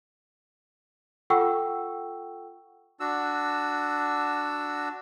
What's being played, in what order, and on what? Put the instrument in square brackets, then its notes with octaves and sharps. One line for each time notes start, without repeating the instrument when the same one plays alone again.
[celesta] F4 A4 F#5 G5 C#6 E6
[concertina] D4 F#4 E6